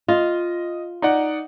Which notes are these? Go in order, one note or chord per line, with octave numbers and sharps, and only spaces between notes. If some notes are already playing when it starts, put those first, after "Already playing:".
F4 D#5
D#4 D5 F#5